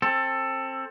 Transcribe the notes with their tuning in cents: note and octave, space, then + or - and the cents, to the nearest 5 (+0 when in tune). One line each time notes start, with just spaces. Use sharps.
C4 +25 A4 +15